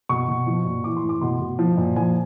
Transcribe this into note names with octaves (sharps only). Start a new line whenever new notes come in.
B2 C#6
B2
F3
A#2
E3 D6
C6
A2
D6
B2 C6
B2
F3
A#2
F3 G#5